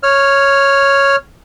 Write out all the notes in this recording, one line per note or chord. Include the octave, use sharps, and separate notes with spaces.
C#5 F6